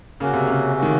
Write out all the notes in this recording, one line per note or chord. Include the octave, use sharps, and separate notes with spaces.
C#3 A#3 C#4 F#4
C3
C#3
A#3 C#4 F#4
D#3